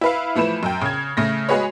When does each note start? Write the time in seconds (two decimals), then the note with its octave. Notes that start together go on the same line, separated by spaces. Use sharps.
0.01 E4 B4 F5
0.35 E3 F3 A3 B4 E7
0.63 F#2 G5
0.81 C#3 G#6
1.17 C#3 A3 A#6
1.49 G#3 F#4 G#4 B4 C#5